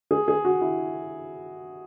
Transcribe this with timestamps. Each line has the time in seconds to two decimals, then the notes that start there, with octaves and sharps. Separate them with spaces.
0.11 G#4
0.28 G#4
0.45 F#4
0.61 E4